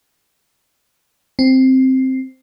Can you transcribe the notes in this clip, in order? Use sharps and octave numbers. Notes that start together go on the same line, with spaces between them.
C4